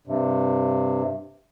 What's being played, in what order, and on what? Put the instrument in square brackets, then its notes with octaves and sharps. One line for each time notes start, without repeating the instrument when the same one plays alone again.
[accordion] G2 C3